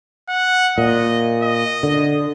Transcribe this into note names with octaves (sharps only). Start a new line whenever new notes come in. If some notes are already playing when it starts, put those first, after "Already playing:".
F#5
A#2 D#5
D#5
D3